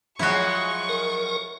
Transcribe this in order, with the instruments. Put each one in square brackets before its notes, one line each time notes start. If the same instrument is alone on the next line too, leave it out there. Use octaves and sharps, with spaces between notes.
[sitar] F3 F#3 G#3 [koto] E4 F#4 [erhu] C#6
[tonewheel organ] A#4